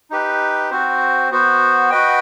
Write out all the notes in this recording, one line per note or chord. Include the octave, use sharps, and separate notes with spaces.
D#4 G4 B4
C4 F#4 C5
B3 F#4 C5
F#4 B4 D#5 G5